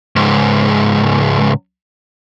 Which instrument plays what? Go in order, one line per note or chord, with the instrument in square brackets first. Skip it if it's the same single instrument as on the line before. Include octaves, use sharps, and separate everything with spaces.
[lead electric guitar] C#2 G#2